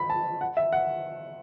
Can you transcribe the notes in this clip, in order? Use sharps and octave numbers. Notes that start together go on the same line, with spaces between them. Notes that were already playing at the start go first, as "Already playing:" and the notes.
Already playing: B5
A5
F#5
E5
F#5